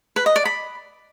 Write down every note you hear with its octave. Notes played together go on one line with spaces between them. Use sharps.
B4
D#5
D5
B5